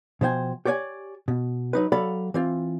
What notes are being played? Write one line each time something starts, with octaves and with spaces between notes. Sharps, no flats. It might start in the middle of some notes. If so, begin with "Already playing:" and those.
B2 F3 C5 G5 G#5
G4 C#5 D5 F#5 G#5
B2
F#3 D#4 B4
F#3 A4 D5 F5 F#5 B5
E3 C4 F4